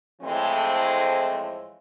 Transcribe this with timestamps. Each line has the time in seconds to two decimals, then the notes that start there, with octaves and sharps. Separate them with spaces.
0.22 A2 E3 F3 G#3 A3 C4